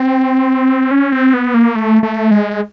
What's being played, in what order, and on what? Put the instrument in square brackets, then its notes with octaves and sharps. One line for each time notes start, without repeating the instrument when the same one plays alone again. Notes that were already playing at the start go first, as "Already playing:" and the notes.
Already playing: [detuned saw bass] C4
C#4
C4
B3
A#3
A3
A3
G#3